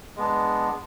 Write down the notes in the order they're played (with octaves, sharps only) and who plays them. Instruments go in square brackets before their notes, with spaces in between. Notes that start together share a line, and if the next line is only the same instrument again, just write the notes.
[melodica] G#3 B3 D4